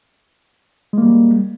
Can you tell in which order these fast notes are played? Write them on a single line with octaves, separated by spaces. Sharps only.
G#3 A#3 G3